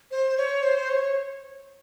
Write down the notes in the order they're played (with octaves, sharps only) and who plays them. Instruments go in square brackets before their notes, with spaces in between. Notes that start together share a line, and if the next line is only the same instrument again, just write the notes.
[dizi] C5
C#5
C5
C#5